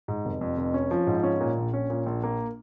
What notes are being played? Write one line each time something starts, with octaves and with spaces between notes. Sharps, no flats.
G#2
F1
F2
F1
C#4
F3
G#2
C#4
A#2
A#1
C#4
A#2
A#1
A#3